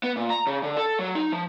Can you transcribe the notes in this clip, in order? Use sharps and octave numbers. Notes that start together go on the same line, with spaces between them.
B3
A#2
A#5
C#3
D3
A4
F#3
D#4
F3